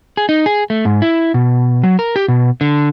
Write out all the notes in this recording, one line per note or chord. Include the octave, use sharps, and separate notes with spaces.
G#4
D#4
G#4
A3
G#2
E4
B2
F#3
A#4
G4
B2
D3